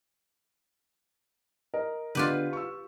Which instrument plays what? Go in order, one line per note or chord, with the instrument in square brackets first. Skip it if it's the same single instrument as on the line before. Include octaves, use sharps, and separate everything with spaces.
[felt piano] A#4 D#5
[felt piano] D3 B3 [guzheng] F4 G4 B4
[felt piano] C#6 E6